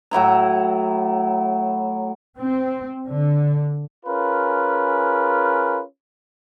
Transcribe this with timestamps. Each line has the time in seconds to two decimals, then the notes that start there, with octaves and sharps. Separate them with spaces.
0.11 A2 F#3 E4 A#5
2.37 C4
3.08 D3
4.06 C#4 F4 G#4 A#4 B4